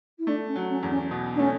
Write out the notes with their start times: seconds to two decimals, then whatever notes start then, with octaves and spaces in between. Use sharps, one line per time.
0.19 E4
0.27 A3 D4
0.48 C#4
0.56 F#3
0.70 C#4
0.83 E2
0.90 C#4
1.11 B2
1.35 D4
1.39 A3 C#4